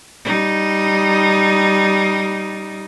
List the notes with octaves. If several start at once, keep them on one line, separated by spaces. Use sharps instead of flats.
G3 D#4